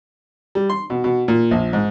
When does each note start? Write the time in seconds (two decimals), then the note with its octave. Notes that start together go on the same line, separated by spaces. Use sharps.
0.55 G3
0.70 C6
0.90 B2
1.04 B2
1.28 A#2
1.51 A#1
1.73 G#2